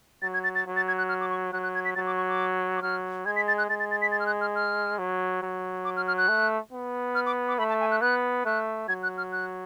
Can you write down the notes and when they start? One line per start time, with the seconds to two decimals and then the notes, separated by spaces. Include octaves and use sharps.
0.22 F#3 A6
0.34 G#6
0.44 A6
0.55 A6
0.66 F#3
0.76 A6
0.88 G#6
0.98 F#6
1.09 F6
1.21 D6
1.30 C#6
1.53 F#3 F#6
1.63 F#6
1.75 G#6
1.85 B6
1.95 F#3 A6
2.07 D6
2.17 C#6
2.29 D6
2.76 D6
2.82 F#3 F6
3.25 G#3 G#6
3.36 B6
3.48 A6
3.58 F#6
3.69 G#3 A6
3.80 A6
3.91 A6
4.02 B6
4.12 A6
4.20 F6
4.26 F#6
4.41 F6
4.56 F6
4.98 F#3
5.42 F#3
5.85 D6
5.97 F6
6.08 F6
6.18 F#6
6.28 A3
6.72 B3
7.15 F6
7.26 D6
7.48 D6
7.58 A3 B5
7.69 A5
7.80 G#5
7.91 F#6
8.01 B3 F#6
8.45 A3 F#6
8.88 F#3 G#6
9.03 F#6
9.18 F6
9.32 F#6